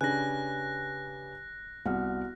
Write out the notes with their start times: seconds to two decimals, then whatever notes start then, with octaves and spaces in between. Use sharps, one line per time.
0.01 C#3 D4 G4 B4 G#5 F#6 A#6
1.86 C2 B3 F#4 F#5 F6